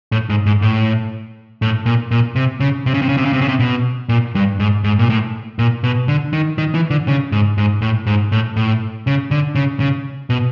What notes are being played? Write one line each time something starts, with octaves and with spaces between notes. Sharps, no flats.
A2
G#2
G#2
A2
A2
A#2
A#2
C3
C#3
C3
C#3
C3
C#3
C3
C#3
C3
C#3
C3
B2
A#2
G2
G#2
G#2
A#2
A2
A#2
B2
D3
D#3
D#3
E3
D3
C#3
G#2
G#2
A2
G#2
A2
A2
C#3
D3
C#3
C#3
B2